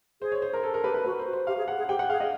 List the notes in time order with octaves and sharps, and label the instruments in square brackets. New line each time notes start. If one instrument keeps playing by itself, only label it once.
[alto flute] G#4 [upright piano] C5
[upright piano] C#5
C5
A#4
[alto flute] G#4 [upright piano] A4
[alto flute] G#4 [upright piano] A#4
[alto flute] G4 [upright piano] B4
[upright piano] B4
[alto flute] F#4 [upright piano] B4
[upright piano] C5
[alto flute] F#4
[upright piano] C5
[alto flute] G4 [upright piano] F5
[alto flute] G#4
[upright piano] F#5
[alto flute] G#4
[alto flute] G4 [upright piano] G5
[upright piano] F#5
[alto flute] G#4 [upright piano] F5
[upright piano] D#5